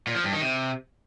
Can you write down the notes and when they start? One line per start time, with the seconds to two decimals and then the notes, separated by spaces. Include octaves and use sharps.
0.07 A#2
0.15 F3
0.24 G2
0.33 D#3
0.42 C3